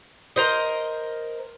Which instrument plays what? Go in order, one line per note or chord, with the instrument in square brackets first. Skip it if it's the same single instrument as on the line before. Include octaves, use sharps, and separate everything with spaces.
[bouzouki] A#4 C5 D#5